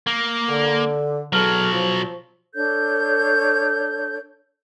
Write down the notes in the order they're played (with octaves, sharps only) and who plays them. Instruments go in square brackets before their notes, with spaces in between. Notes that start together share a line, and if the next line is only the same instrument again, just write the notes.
[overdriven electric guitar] A#3
[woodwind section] D3
[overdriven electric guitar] B1 F#3 [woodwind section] E2 A4 F6
[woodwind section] F3
[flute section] D4 A4 C#5 G6